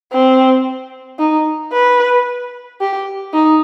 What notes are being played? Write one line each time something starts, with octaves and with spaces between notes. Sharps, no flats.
C4
D#4
B4
G4
D#4